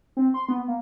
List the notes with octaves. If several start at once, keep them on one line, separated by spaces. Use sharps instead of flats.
C4
C6
B3
A#3